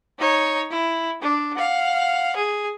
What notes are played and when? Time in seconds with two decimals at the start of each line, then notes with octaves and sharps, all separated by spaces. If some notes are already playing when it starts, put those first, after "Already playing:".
0.19 D#4 C#5
0.70 E4
1.22 D4
1.55 F5 F#5
2.36 G#4